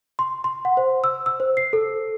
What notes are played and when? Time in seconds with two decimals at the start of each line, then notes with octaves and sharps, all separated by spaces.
0.19 C6
0.44 C6
0.65 F#5
0.77 C5
1.04 E6
1.26 E6
1.40 C5
1.57 C7
1.73 A4